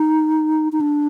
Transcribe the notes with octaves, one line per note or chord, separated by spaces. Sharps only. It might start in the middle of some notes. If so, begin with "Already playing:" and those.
Already playing: D#4
D#4
D4